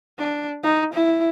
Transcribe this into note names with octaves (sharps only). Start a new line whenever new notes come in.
D4
D#4
E4